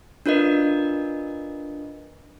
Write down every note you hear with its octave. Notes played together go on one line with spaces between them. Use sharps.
D4 F4 A#4 B4 D#5